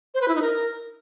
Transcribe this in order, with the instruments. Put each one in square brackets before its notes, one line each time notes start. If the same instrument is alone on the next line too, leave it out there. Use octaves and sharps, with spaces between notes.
[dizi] C5
B4
E4
D#4
A#4